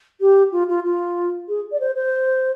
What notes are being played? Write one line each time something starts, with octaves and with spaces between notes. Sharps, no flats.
G4
F4
F4
F4
G#4
D5
C5
C5